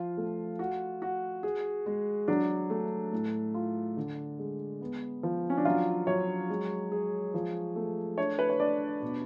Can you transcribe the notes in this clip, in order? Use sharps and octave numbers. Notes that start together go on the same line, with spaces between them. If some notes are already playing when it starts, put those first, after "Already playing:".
Already playing: F3 F4
A3
F#4
F#4
G#4
G#3
F#3 D4
A3
A2
F4
D3
G#3
B3
F3
C#4
D4
F#3 F4
F#3 C#5
G#3
G#4
F3
A3
D4 C#5
B4
C#5
D4 D5
B2